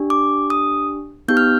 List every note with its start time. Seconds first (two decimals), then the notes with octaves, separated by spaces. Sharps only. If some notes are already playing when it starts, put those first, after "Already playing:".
Already playing: D4 G4
0.10 D6
0.50 D#6
1.28 B3 D#4 G4 G6
1.37 F6